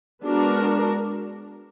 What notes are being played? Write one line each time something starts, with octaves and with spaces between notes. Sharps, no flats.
G#3 B3 D4 F#4 A#4